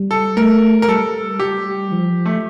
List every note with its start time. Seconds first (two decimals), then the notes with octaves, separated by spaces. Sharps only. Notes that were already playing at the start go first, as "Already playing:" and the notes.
Already playing: G3
0.11 A4
0.37 A3 A#4
0.82 A#4
0.88 G3 A4
1.40 G3 G4
1.92 F3
2.25 A3